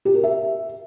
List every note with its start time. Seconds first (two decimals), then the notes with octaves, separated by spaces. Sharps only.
0.05 G4
0.14 A#4
0.24 E5